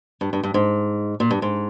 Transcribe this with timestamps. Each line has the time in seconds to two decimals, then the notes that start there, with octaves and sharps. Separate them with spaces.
0.21 G2
0.33 G2
0.43 G2
0.54 G#2
1.20 A#2
1.31 G2
1.42 G#2